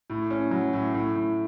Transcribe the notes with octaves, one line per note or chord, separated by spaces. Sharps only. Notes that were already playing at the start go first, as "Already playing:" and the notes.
A2
C#4
F#3
A2
A2
A2